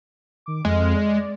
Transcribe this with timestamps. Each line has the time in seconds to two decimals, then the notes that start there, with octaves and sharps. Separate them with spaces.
0.46 D#3 D6
0.65 F2 G#3 F6
0.95 D5